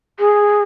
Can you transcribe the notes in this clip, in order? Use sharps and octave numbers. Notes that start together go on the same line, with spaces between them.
G#4